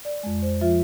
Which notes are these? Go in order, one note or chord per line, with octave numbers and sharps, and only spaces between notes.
D5
F2 G#3
C5
F3 F4 E5